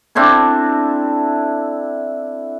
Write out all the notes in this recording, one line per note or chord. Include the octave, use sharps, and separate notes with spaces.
C4 D4 E4 A4